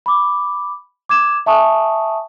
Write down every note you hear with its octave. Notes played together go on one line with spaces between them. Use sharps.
B5 D6
D6 G#6 E7
E5 G#5 A5 C#6 D#6